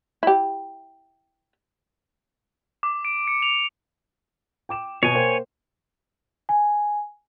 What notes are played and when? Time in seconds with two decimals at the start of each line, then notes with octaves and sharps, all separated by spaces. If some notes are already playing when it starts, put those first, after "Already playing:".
0.23 E4 G4
2.83 D6
3.05 D7
3.27 C#7
3.42 F7
4.69 G5 D6 E7
5.03 B2 B3 C#5 G#5
5.15 A#3 C5 G5
6.49 G#5